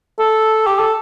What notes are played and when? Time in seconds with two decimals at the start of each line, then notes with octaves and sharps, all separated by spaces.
0.19 A4
0.67 G4
0.79 A4